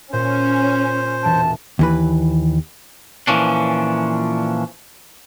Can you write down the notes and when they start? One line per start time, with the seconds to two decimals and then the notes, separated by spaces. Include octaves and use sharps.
0.13 A#2 C#4 C5
1.23 E1 A5 D7
1.79 D#2 E3 B4
3.27 A#2 E3 F3 C#4 D4